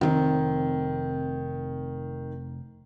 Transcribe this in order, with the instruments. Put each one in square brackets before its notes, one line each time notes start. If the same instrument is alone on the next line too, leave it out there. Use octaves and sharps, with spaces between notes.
[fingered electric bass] F1 A2 C4 [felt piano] D#3